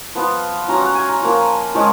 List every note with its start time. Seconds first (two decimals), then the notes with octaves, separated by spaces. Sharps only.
0.15 F3 B3 F4
0.68 F#3 C#4 F4 A#5
0.82 F#5
0.95 G#5
1.09 A#5
1.22 F3 A#3 F4
1.74 F3 G#3 C#4 F4